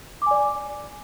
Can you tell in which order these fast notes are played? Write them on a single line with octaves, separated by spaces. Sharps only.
D6 G#5 D5